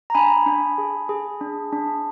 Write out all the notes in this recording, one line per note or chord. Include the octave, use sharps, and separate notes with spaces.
A#5
D4 G#5 B5
D4
G#4
G#4
D4
D4